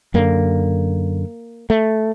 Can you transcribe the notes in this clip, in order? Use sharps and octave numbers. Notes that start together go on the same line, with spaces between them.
F#2 D3 A#3
A3